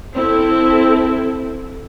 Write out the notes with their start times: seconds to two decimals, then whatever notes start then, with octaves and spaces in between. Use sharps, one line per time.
0.14 C4 E4 A4